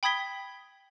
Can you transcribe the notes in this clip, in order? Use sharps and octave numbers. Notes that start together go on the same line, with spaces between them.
G5 B5 D#6 G#6 B6 G7